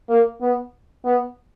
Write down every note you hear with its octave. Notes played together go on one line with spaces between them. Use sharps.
A#3
B3
B3